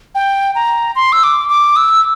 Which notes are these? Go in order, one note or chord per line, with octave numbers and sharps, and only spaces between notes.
G5
A#5
C6
E6
D6
D6
E6